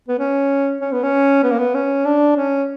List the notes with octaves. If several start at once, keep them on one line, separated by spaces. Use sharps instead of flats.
B3
C#4
C#4
B3
C#4
B3
A#3
B3
C#4
D4
C#4